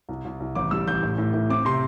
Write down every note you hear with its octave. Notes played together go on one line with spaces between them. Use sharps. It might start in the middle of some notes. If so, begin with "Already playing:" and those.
C2
C2
C2
A1 D6
G3 E6
A1 G6
A2
A2
A2
C4 D6
C3 C6